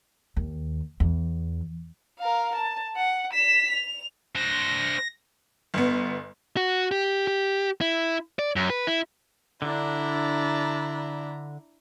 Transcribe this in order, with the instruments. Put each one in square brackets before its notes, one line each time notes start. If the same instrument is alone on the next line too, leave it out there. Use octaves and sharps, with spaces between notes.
[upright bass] D#2
E2
[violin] A#4 F5
A5
F#5
B6 E7
F7
[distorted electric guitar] D4 C5 [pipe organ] A#6
[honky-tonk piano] G1 B3
[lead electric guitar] F#4
G4
G4
E4
D5
F#2
B4
E4
[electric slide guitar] D3 [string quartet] D4 E4 A#5